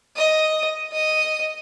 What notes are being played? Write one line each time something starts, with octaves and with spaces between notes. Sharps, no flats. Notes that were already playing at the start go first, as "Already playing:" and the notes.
D#5
D#5